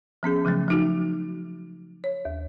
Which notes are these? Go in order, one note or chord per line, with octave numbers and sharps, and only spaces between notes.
F3 B3 C#4 G#4
C#3 F3 F#3 A3
F3 D#4 F#4
C#5
D#2